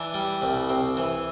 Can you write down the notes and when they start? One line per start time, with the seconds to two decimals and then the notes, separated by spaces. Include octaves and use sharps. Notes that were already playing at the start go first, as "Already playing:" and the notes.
Already playing: E3 D4
0.14 G3
0.42 C2
0.69 C3
0.97 E3